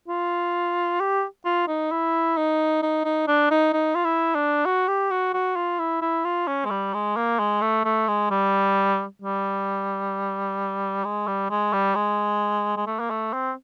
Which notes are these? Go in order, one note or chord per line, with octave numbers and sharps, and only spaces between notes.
F4
G4
F4
D#4
E4
D#4
D#4
D#4
D4
D#4
D#4
F4
E4
D4
F#4
G4
F#4
F#4
F4
E4
E4
F4
C#4
G#3
G3
G#3
A#3
G#3
A3
A3
G#3
G3
G3
G#3
G3
G#3
G3
G#3
G#3
A3
A#3
A3
C4